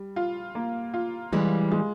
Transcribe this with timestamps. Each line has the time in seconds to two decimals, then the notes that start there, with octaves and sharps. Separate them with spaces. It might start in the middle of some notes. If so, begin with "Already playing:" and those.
Already playing: G3
0.16 F4
0.55 A#3
0.94 F4
1.33 E3 G3 G#3
1.72 G#3